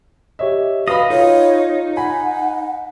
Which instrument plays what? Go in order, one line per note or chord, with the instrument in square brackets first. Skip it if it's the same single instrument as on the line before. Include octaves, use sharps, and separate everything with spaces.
[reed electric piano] G4 C#5 D#5 [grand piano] E5
[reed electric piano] F#4 [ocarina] B4 [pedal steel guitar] D#5 [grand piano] F5 B5
[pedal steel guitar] D#4 [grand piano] F4 [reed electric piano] A4 [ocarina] C#5
[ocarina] F#5 [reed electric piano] G#5 [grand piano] B5